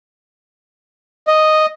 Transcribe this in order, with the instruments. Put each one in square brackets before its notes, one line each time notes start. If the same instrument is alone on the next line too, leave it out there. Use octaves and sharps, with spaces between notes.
[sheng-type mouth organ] D#5